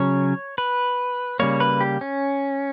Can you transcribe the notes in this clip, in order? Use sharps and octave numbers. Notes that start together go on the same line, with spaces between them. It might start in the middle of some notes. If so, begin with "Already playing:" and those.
Already playing: C#3 F#3 C#4 C#5
B4
C#3 G3 A#3 C#5
B4
G4
C#4